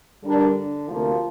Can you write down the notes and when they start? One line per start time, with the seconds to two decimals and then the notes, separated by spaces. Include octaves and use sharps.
0.23 G2 D3 G3 D4 A#4
0.89 D2 C3 F3 A#3